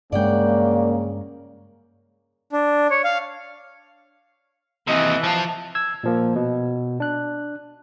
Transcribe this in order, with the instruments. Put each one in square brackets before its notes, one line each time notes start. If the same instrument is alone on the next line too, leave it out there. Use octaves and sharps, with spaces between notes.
[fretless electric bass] G2 G#3 [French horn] C#3 [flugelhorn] A#3 [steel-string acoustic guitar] D5 F#5 G5
[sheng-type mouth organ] D4
C#5
F5
[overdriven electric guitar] D#2 C3 [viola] E3 [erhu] D#5
[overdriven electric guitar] F3 F4 [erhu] A5
[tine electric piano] E6 G#6
A#2 F3 A#3
B2
D4 F#6